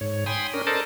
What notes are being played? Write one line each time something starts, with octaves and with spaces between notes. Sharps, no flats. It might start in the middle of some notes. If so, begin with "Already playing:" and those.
G#2 C#5
G5 G#5 B5 C6 D#6
C#4 D4 A#4
A4 A#4 C5 D5 D#5 A5